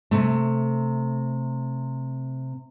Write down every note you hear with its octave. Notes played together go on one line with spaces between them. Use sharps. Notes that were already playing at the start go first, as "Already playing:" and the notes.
C3 A3